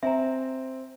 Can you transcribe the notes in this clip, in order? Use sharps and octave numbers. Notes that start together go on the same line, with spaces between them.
C4 E5 G#5 A#5